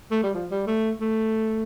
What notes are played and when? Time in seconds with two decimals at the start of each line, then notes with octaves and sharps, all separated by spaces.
0.11 A3
0.23 G3
0.34 F3
0.51 G3
0.67 A3
1.00 A3